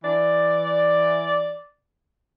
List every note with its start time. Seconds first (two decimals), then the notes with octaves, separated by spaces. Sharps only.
0.04 E3 D5